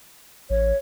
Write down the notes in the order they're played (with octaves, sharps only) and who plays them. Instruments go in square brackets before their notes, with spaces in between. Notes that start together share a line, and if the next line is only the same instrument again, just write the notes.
[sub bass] A1 [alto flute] C#5